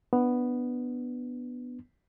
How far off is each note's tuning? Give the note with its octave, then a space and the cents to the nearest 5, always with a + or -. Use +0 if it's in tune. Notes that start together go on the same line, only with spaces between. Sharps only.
B3 +0 D4 +10